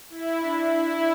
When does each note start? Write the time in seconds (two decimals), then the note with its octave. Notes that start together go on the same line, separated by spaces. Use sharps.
0.10 E4
0.40 D4
0.70 E4